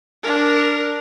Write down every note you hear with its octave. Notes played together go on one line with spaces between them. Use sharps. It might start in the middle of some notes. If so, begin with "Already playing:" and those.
D4 A#4